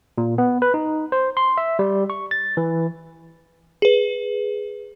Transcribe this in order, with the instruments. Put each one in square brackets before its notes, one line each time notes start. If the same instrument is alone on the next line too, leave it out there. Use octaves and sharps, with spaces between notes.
[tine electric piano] A#2
B3
B4
D#4
C5
C6
E5
G3
C#6
A6
E3
[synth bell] G#4 B4